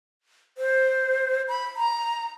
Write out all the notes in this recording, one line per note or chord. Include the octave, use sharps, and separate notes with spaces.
C5
B5
A#5